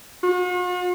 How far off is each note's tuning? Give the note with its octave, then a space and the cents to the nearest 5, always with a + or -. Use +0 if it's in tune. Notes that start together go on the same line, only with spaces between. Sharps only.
F#4 -45